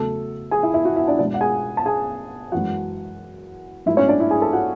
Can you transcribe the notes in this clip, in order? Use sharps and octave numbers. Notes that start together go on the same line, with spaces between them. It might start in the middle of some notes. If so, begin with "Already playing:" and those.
Already playing: E2 C#3 F#3 A3 A4 A5
G#4 G#5
E4 E5
E4 E5
F#4 F#5
E4 E5
D4 D5
B2 G#3 D4 D5
F#5
G#4 G#5
A5
G#4 G#5
F#2 E3 G#3 F#4 F#5
G#2 F#3 A3 E4 E5
C#4 C#5
D4 D5
E4 E5
G#4 G#5
A4 A5
F#4 F#5